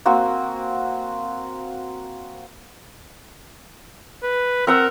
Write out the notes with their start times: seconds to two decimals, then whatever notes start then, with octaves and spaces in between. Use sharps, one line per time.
0.06 A#3 C4 F#4
4.22 B4
4.67 C4 A#4 F#5 E6